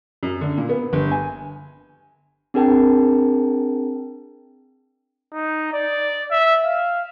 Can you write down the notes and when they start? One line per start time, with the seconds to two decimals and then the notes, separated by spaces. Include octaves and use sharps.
0.23 F#2
0.41 D3
0.57 A#2
0.69 B3
0.93 G1
1.12 G#5
2.54 C4 D4 G#4 A#4 G5 A5
5.33 D#4
5.73 D5
6.31 E5
6.64 F5